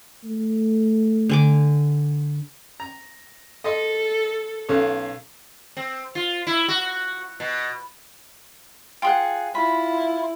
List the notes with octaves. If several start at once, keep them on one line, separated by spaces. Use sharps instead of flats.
A3
D3 G#5 D6
A#5
A4 D#5 C6
B1 C#4 A4 F5
C4
F4
E4
F#4
B2
F4 G#4 F#5 G5 C6
E4 F4 B5